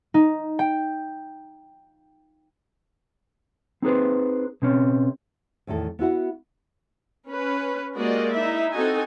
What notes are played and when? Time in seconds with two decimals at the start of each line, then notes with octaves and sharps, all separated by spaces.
0.14 D#4
0.59 G5
3.82 C4 D#4 G#4 B4 C5
4.62 B2 C4 C#4
5.67 E2 A2 D#3 A4
5.99 B3 E4 F#4 F#5
7.29 C#4 B4
7.97 G#3 A#3 F#4 G4 D5 D#5
8.32 D#4 E4 E5
8.73 C4 D#4 F#4 A4 D#5 G#5